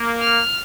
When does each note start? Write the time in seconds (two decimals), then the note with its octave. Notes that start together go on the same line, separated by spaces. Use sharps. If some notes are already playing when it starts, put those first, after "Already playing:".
Already playing: A#3
0.22 F6